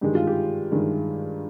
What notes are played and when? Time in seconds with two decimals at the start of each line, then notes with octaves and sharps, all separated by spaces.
0.01 G2 D#3 G#3 G4
0.15 F4
0.27 G4
0.72 G2 D#3 G#3